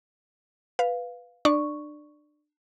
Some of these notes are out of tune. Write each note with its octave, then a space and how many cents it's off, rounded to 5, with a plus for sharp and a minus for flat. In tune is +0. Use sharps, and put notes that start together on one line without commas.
B4 +0 F5 +0
D4 +30 D5 +0 C#6 +0